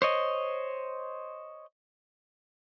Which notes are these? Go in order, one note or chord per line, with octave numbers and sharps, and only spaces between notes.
C5 C#5 D#5